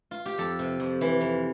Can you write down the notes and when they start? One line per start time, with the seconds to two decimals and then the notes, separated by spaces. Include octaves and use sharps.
0.11 F4
0.26 G4
0.38 F2 A4
0.59 C3
0.80 F2
1.01 E3
1.21 F2